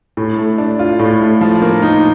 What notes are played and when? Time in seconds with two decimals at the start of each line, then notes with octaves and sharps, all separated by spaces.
0.17 A2
0.38 A3
0.58 D4
0.79 F4
0.99 A2
1.21 A3
1.41 F3
1.62 A#3
1.82 D#4